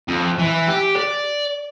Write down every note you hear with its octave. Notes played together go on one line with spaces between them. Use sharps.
F2
E3
G4
D5